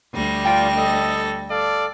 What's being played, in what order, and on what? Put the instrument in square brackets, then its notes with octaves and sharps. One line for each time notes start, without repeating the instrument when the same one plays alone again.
[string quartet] D2 G3 A#6
[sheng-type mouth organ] D4 F4 [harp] G5 A6 D7
[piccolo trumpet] A4 [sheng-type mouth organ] D#5
[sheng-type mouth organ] A4 F5 [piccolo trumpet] D5